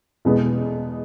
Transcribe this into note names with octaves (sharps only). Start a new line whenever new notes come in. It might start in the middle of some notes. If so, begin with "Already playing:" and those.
E2 B2 G#3 B3